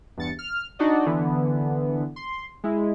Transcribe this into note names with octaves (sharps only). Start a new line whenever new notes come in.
E2 G2 A6 C#7
F6
D4 D#4 F#4 D5 D#5
D3 E3 B3
C6
G#3 E4